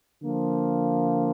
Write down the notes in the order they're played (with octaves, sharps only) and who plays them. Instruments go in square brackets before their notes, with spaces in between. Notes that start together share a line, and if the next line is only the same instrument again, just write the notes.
[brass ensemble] D3 F3 A#3